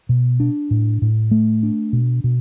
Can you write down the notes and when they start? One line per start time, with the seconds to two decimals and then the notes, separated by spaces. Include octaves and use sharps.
0.09 B2
0.40 D4
0.71 A2
1.02 A2
1.31 A3
1.63 D4
1.93 B2
2.24 B2